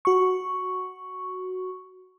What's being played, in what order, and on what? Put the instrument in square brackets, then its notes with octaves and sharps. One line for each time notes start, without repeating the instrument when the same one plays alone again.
[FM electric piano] F#4 C#6